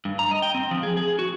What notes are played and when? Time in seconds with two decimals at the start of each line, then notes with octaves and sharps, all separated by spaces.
0.05 G2
0.19 A#5
0.31 D#5
0.42 G5
0.55 C4
0.71 F3
0.83 G#4
0.97 G#4
1.19 F#4